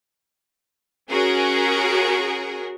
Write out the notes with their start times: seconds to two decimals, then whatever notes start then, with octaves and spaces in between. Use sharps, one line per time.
1.10 C#4 F#4 G#4 A#4